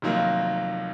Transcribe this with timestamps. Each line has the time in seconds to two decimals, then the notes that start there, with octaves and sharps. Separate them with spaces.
0.02 F1 F2 D#3 F#3 A#3